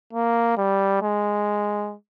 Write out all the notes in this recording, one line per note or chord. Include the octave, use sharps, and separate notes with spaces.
A#3
G3
G#3